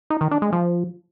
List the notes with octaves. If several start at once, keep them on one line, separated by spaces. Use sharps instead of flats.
D#4
D#3
D4
G#3
F3